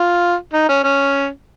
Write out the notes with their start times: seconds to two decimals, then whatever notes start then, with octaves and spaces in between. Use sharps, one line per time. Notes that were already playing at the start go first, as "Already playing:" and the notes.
Already playing: F4
0.53 D#4
0.69 C#4
0.84 C#4